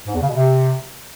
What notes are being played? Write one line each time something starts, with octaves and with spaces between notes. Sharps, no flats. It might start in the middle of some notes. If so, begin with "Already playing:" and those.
G#2
E2
C#3
B2
C3